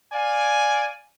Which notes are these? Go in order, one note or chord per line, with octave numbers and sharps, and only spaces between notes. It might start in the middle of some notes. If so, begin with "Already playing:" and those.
D5 F5 G#5